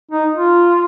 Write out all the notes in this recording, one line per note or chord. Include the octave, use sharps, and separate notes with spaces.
D#4
F4